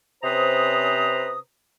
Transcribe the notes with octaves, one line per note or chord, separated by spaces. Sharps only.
C3 C#4 B4 C5 A#5 D#6